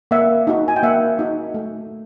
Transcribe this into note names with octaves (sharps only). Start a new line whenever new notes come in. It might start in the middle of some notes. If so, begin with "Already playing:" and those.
A#3 E5 F#5
D#4 F#4
G#5
G5
A#3 E5 F#5
D#4 F#4
A3